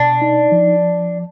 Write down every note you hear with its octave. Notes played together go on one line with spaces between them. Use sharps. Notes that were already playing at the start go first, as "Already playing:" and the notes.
Already playing: B2 D4
D#4
F3